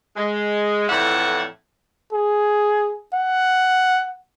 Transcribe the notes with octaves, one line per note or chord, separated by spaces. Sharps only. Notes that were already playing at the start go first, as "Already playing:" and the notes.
G#3
F2 A2 E3 D5 E5 F#5
G#4
F#5